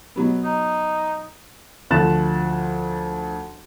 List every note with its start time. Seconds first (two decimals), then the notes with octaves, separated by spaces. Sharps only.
0.16 B2 F#3 B3
0.44 D#4
1.91 D2 F3 F#6 A6 E7